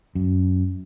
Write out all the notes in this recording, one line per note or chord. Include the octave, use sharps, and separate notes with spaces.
F#2